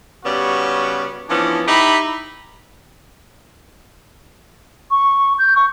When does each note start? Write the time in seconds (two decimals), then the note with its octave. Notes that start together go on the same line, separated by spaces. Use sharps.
0.25 C#3 G3 B3 C#4 F#4
1.29 E3 F3 B3 C#4 D4
1.68 D#4 E4 G4 B5
4.91 C#6
5.38 G6
5.55 C#6